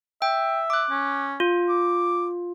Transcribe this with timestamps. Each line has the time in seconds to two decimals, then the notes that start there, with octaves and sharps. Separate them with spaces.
0.22 E5 G5
0.70 D6 F#6
0.90 C#4
1.40 F4
1.69 D6